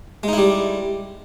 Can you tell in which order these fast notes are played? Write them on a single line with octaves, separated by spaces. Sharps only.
G#3 D#4 E4 G3